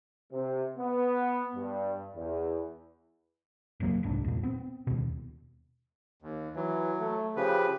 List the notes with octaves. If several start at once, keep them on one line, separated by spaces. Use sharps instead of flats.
C3
B3
G2
E2
F1 A#1 F#3 A#3
D#1 C2 G#2 D4
E2 A#2
B3 C4
D#2 B2
D#2
E3 F#3
A3
C#3 F3 G4 B4